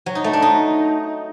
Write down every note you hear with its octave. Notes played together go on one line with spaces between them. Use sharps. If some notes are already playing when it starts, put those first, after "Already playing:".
F#3
D#4
A3
D4
D#4